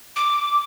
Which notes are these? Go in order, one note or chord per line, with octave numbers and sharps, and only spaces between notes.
D6